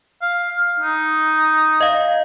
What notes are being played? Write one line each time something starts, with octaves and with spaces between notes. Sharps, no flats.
F5
D#4
D#5 F5